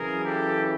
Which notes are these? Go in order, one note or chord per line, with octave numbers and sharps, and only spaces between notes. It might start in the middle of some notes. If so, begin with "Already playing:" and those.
Already playing: F#2 C#3 E3 G#4 A#4
G4 A4